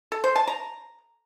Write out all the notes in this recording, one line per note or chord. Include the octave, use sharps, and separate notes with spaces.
A4
C5
A5
A#5